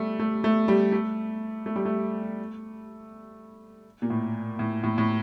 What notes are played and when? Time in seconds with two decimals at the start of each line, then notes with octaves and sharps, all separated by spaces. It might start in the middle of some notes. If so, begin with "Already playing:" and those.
Already playing: G3 A3
0.19 A3
0.44 A3
0.68 G3
0.92 A3
1.66 A3
1.76 G3
1.86 A3
4.02 A#2
4.10 A2
4.59 A2
4.84 A2
4.98 A2